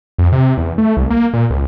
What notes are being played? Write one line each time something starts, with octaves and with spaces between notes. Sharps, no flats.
F2
C3
E2
A3
C2
A#3
A#2
C#2